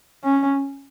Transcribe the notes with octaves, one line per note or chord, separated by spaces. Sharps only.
C#4